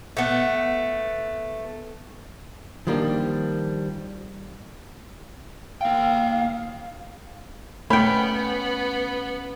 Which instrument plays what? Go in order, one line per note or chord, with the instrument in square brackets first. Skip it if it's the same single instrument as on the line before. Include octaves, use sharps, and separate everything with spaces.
[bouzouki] A3 B3
[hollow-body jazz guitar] D#3 F3 G3 A#3 D4 G4
[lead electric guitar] A#3 G5 [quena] F5
[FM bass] A3 [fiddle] B3 [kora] C#4 G5 [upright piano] B5